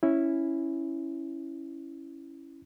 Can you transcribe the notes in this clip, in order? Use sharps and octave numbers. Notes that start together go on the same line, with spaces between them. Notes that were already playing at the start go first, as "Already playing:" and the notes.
C#4 E4